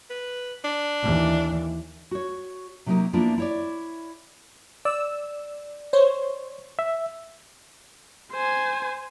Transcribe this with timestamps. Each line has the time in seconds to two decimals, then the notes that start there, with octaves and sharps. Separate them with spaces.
0.10 B4
0.64 D4
1.02 D#2 E3
2.11 F#4 C#5
2.86 C3 F#3 G3 A#3 D#4 G4
3.13 F3 A#3 B3 D4 E4 F4
3.38 E4 C#5 D5
4.85 D5 E6
5.93 C5 C#5
6.79 E5
8.33 C5 G#5